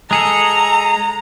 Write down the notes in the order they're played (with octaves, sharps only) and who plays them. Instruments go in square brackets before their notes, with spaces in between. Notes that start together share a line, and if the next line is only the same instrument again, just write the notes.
[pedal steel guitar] G#3 G#4 A4 [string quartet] A#5